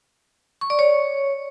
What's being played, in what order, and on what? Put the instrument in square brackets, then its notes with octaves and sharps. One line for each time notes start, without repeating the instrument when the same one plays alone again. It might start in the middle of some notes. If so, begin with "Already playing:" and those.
[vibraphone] C#6
D5
C#5